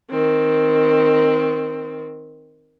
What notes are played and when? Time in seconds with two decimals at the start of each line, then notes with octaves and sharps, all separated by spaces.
0.11 D#3 C4